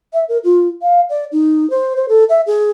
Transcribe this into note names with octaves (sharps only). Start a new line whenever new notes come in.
E5
A#4
F4
F5
D5
D#4
C5
C5
A4
E5
G#4